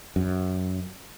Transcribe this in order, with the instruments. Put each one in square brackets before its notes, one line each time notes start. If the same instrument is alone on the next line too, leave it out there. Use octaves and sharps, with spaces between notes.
[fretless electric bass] F#2